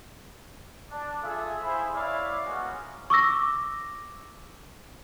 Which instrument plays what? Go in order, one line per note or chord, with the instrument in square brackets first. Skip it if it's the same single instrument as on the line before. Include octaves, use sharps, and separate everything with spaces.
[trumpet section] D4
F4 G#4 A4 E5
E4 G#4 C5 E5 B5
E4 C#5 D5 E5 F5
G#3 A#3 B3 C#4 F#4
[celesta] C#6 D6 E6 A#6